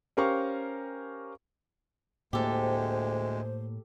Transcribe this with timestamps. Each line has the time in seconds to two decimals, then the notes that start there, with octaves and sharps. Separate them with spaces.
0.17 C#4 G4 A#4 C5 F5 C#6
2.33 D2 A2 G#3 A#3 G4 A4 C5